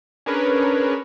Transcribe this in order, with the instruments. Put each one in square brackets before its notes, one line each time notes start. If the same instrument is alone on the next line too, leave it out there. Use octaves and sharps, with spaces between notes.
[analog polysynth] C#4 D4 G#4 A#4 B4 C#5